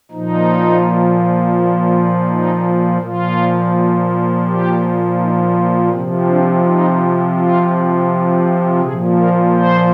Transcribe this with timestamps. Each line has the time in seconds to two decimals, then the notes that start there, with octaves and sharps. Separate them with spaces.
0.12 A#2 F3 D#4
2.29 D#4
3.01 A#2 F3 F4
4.47 G4
5.19 D#4
5.55 F4
5.92 C3 F3 C4
6.28 D4
6.65 D#4
7.36 F4
8.81 A#2 F3 G#4
9.18 A#4
9.54 C5